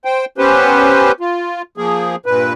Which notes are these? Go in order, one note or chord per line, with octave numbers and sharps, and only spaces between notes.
C5 G5
B3 C#4 G4 B4 C5
F4
F3 A#3 G#4
G2 A#2 B4